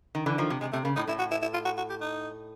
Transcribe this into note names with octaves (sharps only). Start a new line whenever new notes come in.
D#3
D3 E3
D#3 F3
C3
C3 G#3
C3 A3
C#3 A#3
A2 D#4
A2 E4
F#4
E4
E4
F4
F#4
F#4
G4
D#4